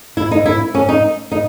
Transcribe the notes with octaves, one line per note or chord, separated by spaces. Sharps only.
E4
D#4
E4
C#4
D#4
D#4